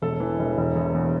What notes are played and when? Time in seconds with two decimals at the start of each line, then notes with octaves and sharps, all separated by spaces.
0.02 E1 A4
0.20 E3
0.39 E1
0.57 E1
0.75 E2
0.94 E2